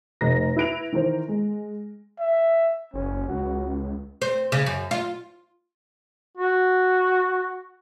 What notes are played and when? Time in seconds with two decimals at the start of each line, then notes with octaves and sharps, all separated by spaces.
0.21 F1 C3 A3 D#5 A#5 A#6
0.56 E4 B4 D7 F7
0.92 D#3 E3 A#4 C5
1.28 G#3
2.20 E5
2.94 F#1 C#4
3.29 C#2 F#4
4.22 C4
4.52 C#3
4.66 F#2
4.91 F4
6.38 F#4